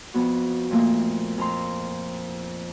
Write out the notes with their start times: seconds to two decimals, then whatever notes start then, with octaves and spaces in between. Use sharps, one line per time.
0.14 F2 B3 F#4
0.71 F2 A#2 A3 A#3 F4
1.38 F2 A#5 C6